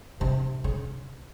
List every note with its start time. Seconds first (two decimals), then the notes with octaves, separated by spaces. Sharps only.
0.21 C3
0.64 C#3